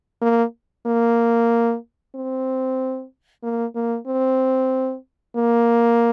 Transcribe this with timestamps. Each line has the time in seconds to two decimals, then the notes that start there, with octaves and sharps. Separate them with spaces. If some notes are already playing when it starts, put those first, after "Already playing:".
0.21 A#3
0.86 A#3
2.15 C4
3.43 A#3
3.75 A#3
4.07 C4
5.36 A#3